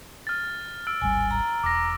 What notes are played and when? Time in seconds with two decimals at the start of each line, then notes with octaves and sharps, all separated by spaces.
0.27 F6 A6
0.87 E6 F6 D7
1.02 D1 G#1 G3 G#5
1.31 A#5
1.63 E1 D6 A#6